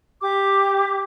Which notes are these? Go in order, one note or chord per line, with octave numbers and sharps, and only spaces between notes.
G4 D6